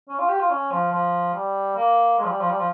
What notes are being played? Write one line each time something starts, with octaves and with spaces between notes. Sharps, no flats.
C#4
F4
G4
F4
C#4
F3
F3
G3
A#3
G#3
F3
G3
F3
G3
F3